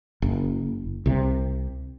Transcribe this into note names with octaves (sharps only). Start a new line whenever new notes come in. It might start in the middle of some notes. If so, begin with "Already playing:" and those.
F#1
C2 C3